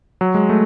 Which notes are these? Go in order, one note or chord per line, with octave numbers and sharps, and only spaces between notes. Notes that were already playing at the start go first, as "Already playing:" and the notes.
F#3
G#3
A3